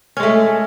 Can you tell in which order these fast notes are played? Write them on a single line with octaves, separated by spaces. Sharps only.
C#4 G#3 A3